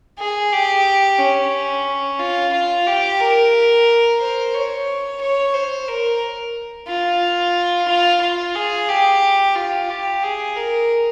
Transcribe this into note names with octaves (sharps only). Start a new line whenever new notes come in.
G#4
G4
C#4
F4
F4
G4
A#4
C5
C#5
C#5
C5
A#4
F4
F4
F4
G#4
G4
F4
G4
G#4
A#4